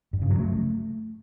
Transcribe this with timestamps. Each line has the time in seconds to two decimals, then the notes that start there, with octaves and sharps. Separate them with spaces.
0.13 G2
0.22 C#3
0.30 F#3
0.39 A3